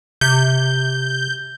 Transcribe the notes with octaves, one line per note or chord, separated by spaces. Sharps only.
C3 G6